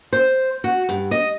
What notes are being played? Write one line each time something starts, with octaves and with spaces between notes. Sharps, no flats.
C5
F#4
G2
D#5